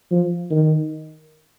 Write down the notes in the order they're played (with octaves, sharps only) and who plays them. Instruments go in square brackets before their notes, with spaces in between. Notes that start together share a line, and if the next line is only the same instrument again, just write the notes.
[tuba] F3
D#3